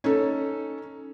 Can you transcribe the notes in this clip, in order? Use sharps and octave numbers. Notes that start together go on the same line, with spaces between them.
C#4 D#4 A4